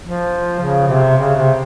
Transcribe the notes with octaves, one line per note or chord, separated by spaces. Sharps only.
F3
C#3
C3
C#3
C3